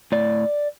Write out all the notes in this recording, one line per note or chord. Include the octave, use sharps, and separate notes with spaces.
A2 D5